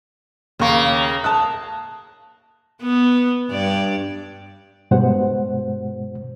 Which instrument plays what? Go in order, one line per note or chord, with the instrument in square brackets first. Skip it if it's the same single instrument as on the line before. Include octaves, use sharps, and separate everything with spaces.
[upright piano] D#2 C#6 [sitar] C#3 A#3
[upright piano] A5 D#6 F#6
[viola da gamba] B3
G2 D5
[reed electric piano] G2 B2 G#3 C5 F#5